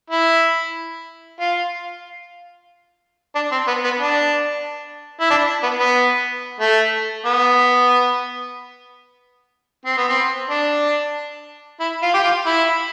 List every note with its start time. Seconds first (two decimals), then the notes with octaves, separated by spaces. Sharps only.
0.10 E4
1.40 F4
3.35 D4
3.52 C4
3.68 B3
3.84 B3
4.01 D4
5.20 E4
5.30 D4
5.63 B3
5.79 B3
6.60 A3
7.26 B3
9.86 C4
9.97 B3
10.09 C4
10.50 D4
11.80 E4
12.02 F4
12.14 G4
12.24 F4
12.46 E4